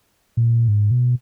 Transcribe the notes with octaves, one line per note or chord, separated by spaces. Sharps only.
A#2
G#2
B2